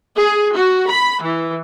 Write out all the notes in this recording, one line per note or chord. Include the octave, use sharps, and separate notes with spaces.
G#4
F#4
B5
E3